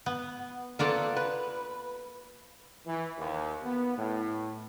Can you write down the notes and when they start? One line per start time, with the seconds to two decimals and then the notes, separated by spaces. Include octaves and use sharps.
0.06 B3
0.79 A#3 B3 F4 A4 D5
1.16 B4
2.86 E3
3.18 D#2
3.64 B3
3.98 A2